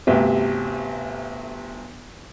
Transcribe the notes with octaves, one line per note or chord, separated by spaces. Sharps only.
G1 D2 C3